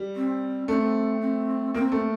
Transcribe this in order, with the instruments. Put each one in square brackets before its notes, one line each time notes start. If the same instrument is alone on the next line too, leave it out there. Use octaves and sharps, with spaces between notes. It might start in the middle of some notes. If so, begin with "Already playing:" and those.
Already playing: [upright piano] G3
[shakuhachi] C4
[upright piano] A3 [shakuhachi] C4 D4
[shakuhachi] C4
[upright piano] A#3 [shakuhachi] C4
[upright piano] A3
[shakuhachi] C4